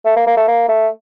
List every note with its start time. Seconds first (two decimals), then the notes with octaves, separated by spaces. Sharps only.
0.05 A3
0.17 A#3
0.27 A#3
0.37 A3
0.48 A#3
0.69 A3